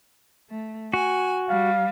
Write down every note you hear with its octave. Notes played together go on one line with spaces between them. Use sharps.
A3
F#4 G#5
G3 F5